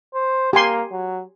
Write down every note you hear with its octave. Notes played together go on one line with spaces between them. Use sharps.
C5
A#3 G4 G#5 C6
F#3